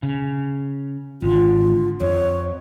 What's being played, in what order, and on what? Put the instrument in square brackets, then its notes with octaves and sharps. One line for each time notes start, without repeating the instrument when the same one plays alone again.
[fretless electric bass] C#3
[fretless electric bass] G#1 D3 [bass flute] F4
[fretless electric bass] F2 [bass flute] C#5